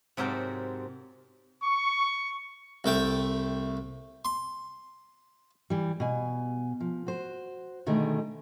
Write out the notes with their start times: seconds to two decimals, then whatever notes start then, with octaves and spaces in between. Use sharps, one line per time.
0.17 G#2 C3 F#3 A#4 G5 A5
1.62 C#6
2.84 C2 A3 G5
4.25 C6
5.70 E3 G3
6.00 B2 G#5
6.80 F3
7.07 F#4 C5
7.86 B2 D3 D#3 G#3 A3